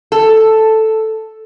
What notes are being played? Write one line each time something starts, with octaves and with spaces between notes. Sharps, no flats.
A4